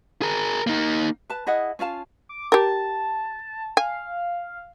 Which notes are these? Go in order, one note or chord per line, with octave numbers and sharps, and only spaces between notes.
G#4 A#4
A#3 D#4
B4 A5
E4 G#4 D#5 F#5
C#4 F4 F5 A5
D6
G4 A#4 A5
F5 G#5